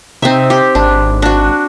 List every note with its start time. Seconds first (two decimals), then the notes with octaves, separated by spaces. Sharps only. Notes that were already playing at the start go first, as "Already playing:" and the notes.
0.22 C3 C4 D#4 E5
0.50 G4
0.75 G#1 D4
1.22 D4 F#4